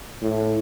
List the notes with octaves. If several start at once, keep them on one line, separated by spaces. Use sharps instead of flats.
A2